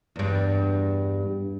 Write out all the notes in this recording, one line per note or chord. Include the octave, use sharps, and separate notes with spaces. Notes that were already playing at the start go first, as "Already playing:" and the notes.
E2 G2